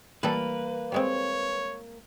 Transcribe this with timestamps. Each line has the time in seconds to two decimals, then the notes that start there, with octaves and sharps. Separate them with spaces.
0.23 E3 G3 A#3 A4 B4
0.92 G3 G#3 C4 C#5